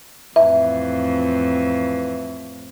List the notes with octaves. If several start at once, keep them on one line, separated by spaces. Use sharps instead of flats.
F2 A2 E3 E5